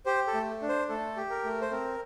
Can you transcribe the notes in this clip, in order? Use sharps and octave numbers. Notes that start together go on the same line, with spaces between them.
G4 C5
A4
A3
D4
C5
A3 A4
G4
A#4
A3
C5
C4 A#4